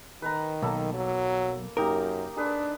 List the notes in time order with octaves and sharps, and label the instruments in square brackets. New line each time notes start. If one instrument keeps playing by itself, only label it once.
[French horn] D#3 [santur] B4 A#5
[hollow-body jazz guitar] B1 [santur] A#3 A4 B5
[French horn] F#3
[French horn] F#2 [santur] A#3 D#4 G4 [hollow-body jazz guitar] A#4
[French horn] D4 [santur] G#4 B4